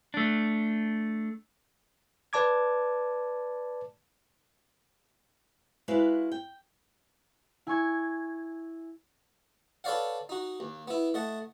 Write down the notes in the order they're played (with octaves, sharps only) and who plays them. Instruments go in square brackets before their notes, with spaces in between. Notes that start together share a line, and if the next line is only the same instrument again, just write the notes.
[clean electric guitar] A3 D4
[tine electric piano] B4 D5 A5 D6 G#6
[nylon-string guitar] G#3 E4 F#4 B4 E5 F5
G5
[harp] E4 G#5 C#6 G#6
[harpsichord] A4 B4 C#5 D5 F5 F#5
D#4 F#4
D#2
B3 E4
A3 D#5 F#5 A5